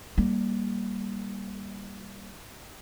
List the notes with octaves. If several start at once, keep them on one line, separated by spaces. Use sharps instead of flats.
G3 A#3